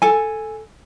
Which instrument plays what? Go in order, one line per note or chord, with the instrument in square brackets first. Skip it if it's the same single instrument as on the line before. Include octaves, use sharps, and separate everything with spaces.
[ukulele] A4 G#5